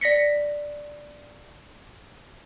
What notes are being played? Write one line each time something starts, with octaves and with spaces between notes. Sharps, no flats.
D5 A#6 B6 C#7